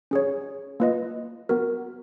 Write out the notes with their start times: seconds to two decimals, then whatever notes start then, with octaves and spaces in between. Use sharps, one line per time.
0.11 C#4 G#4 C#5
0.80 A#3 F4 B4 D#5
1.49 B3 F#4 A#4